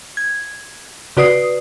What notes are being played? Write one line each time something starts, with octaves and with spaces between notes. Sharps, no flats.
G#6
C#3 F#4 B4 D5 D#6 C7